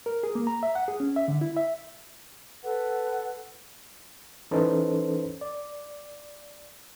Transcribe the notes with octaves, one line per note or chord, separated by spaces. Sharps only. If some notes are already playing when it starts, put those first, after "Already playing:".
A#4
G#4
A#3
A#5
E5
F#5
G#4
C#4
E5
D3
E4
E5
A4 B4 F#5
E3 C#4 D#4 A4 B4 C5
D5